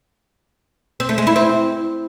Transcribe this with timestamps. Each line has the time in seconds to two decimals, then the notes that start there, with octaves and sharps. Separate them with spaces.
1.00 C4
1.09 A3
1.18 G#3
1.27 E4
1.36 C4